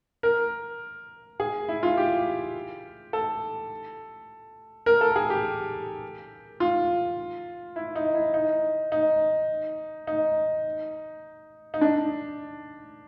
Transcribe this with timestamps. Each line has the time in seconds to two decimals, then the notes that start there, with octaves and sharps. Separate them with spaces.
0.23 A#4
1.40 G#4
1.69 E4
1.83 F4
1.97 G4
3.13 A4
4.86 A#4
5.01 A4
5.16 G#4
5.30 G4
6.60 F4
7.76 E4
7.96 D#4
8.14 E4
8.34 D#4
8.92 D#4
10.07 D#4
11.74 D#4
11.81 D4